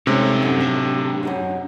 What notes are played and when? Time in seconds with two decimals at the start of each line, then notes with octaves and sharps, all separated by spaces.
0.07 C3 G#3 C#4 D#4 A4 C5 C#5
0.43 F#2
0.61 F#3 D4 G4
1.23 F#2 D#4 F#4